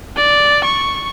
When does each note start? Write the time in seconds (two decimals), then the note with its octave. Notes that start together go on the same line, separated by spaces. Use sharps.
0.17 D5
0.64 C#6